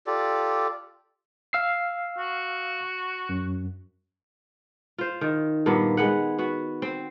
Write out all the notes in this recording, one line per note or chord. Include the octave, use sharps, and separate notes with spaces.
F4 G4 A4 D5
F5 E6 C7
F#4
F#2
F4 C5
D#3
G2 A#2 A#3 B3
G#3 B3 F#5
B3 F#4
C4